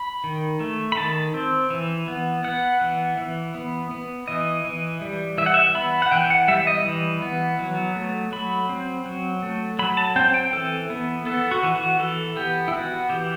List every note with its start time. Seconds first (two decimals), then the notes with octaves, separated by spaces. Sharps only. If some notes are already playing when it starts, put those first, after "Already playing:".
Already playing: B5
0.24 D#3
0.60 A3
0.92 B5
0.97 D#3 A5
1.34 C4
1.70 E3
2.08 B3
2.44 B3 F#5
2.81 E3
3.18 E3
3.55 B3
3.91 B3
4.28 E3 D#5
4.65 E3
5.01 G3
5.38 E3 E5
5.46 F#5
5.54 E5
5.75 B3 B5
6.02 F#5
6.12 E3 G5
6.30 F#5
6.48 G3 E5
6.67 D#5
6.85 E3
7.22 B3
7.59 F#3
7.96 A3
8.32 F#3 B5
8.69 C4
9.06 F#3
9.43 A3
9.79 F#3 B5
9.97 A5
10.16 C4 G5
10.34 G5
10.53 E3 A4
10.90 B3
11.26 B3 A4
11.51 F#4
11.63 E3
11.75 F#4
12.00 E3 A4
12.36 B3 G4
12.68 E4
12.73 B3 F#4
13.10 E3 G4